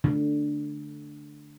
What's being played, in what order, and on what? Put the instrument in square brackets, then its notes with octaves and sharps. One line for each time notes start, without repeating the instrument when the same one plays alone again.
[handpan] D3